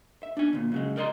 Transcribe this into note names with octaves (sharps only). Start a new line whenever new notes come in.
E5
D4 G#5
D2 A#2
C#3 F#3 G#3
A#4 D5 D#5 A#5 C6